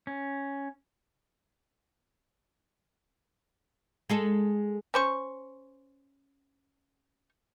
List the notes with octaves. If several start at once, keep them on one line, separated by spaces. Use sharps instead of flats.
C#4
G#3 G#4 A4
C#4 C5 C#6